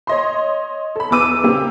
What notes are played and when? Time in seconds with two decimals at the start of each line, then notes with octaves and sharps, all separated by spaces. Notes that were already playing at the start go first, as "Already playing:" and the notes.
0.07 C#5 D#5 C6
0.96 A4 B5
1.10 E2 B2 B4 D6 E6 D#7
1.43 A#2 C#3 A#3 C4 G4